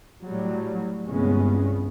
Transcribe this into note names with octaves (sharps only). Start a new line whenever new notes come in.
A2 F#3 G3
G1 C2 G2 G#3 B3 C#4